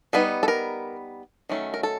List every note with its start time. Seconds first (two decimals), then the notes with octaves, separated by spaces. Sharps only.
0.13 G3 B3 D#4 B4
0.43 A4
0.48 A#4
1.49 D#3 F#3 A3 C#4
1.74 A#4
1.83 A4